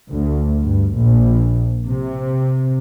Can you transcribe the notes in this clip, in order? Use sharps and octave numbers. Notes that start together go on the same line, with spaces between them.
D2
G2
A#1
C3